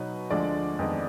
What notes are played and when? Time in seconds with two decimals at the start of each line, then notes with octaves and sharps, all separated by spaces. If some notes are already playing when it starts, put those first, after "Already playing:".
Already playing: B2 F#3 B3 D#4 B4
0.30 D2 D3 F3 G#3 D5
0.79 F2 D#3 G#3 B3 D#4